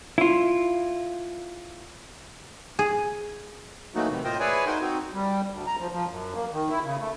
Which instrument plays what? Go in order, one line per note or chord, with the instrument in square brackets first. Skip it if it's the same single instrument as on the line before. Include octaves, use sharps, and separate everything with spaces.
[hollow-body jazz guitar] E4 F4
[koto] G#4
[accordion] E3 F#3 A3 A#3 D#4 F#4
C3 D#3 E3
A2 F4 A#4 C5 D#5 G5
E4 G#4 B4 C#5 D5 G#5
D#4 F#4 A#4 C5 G5 C6
C4 D#4 F#4
G3
D2
A#5
F3
F3
F#2
A#3
D#3
E4
C#3
A3